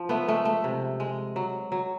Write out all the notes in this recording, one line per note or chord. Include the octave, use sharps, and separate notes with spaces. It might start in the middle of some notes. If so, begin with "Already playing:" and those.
Already playing: F3
A3 B3
G#3 A3
A3
C3
G#3
F#3
F#3